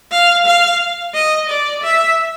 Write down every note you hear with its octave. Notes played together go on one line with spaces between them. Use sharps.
F5
F5
D#5
D5
E5